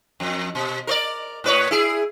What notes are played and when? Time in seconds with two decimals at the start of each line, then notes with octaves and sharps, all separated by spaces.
0.20 F2
0.55 B2
0.87 A#4 C5 D5
1.44 A2 B4 C#5
1.71 E4 G#4